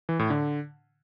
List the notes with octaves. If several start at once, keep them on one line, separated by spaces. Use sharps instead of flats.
E3
A2
D3